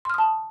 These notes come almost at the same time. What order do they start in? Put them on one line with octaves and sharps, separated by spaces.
C6 F6 D#6 A5